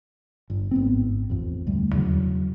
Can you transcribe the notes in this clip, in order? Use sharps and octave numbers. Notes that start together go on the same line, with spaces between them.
G1
G#1 B3 C4
A1 F2
D2 G3
E2 C#3 F#3